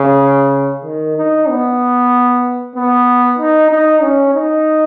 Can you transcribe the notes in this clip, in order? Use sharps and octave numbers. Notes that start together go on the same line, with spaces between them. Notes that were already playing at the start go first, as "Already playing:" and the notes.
Already playing: C#3
D#3
D#4
B3
B3
D#4
D#4
C#4
D#4